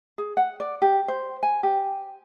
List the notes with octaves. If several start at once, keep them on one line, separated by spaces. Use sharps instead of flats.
G#4
F#5
D5
G4
C5
G#5
G4